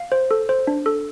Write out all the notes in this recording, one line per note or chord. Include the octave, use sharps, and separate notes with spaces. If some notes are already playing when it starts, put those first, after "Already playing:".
Already playing: F5
C5
A4
C5
D4
A4